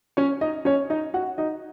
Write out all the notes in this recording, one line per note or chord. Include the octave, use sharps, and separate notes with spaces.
C#4 C#5
D#4 D#5
C#4 C#5
D#4 D#5
F#4 F#5
D#4 D#5